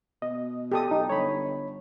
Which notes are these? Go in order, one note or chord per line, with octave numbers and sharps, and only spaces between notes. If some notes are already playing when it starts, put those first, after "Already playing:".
B2 D#5
G4 A4 D#6
B1 D#4
G1 C#5 B5